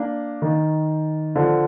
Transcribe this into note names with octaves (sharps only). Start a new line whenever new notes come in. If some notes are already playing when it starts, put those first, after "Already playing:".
Already playing: A#3 D4
D#3
D3 F3